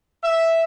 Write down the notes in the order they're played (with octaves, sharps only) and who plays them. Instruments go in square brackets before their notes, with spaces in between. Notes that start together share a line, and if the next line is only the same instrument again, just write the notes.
[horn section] E5